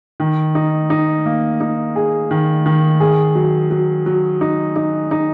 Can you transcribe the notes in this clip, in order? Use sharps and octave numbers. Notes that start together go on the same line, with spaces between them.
D#3
D#4
D#4
A#3
D#4
G#4
D#3
D#3
G#4
F#3
F#3
F#3
D#4
D#4
D#4